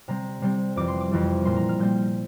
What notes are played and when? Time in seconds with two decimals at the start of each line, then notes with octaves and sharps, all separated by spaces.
0.08 C3 G3 C4 A#5
0.42 C3 G3 C4
0.76 F2 E3 G3 D6
0.88 C6
1.01 D6
1.11 F2 E3 G3
1.45 A#2 G3 A#3 C6
1.56 A#5
1.69 F6
1.79 A#2 G3 A#3 G6